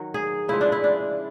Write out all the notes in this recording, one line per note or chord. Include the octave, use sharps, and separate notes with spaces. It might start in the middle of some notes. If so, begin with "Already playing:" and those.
Already playing: D#3 F#3
G#4
C#3 F3 G#3 E4
D4
E4
D4